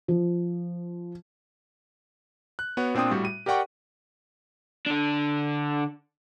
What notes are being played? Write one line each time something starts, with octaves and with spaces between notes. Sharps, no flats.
F3
F#6
B3 F#4 C#5 F#5
A#2 C4 D4 G5 D#6
A2 G3 F#4
D#7
G4 A#4 D5 F#5 G5 C#6
D3 D4